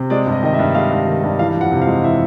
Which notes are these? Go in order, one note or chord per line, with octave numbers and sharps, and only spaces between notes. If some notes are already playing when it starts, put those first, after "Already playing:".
Already playing: C3
G#3 D5
G2
D#5
D#3 D#5
E5
G2
G#3 F5
G2
D#3
G2
E3 F5
F2
F#5
C3
F5
G#3
E3 E5